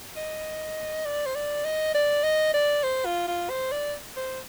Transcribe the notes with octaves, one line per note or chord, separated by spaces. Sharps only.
D#5
D5
C5
D5
D#5
D5
D#5
D5
C5
F4
F4
C5
D5
C5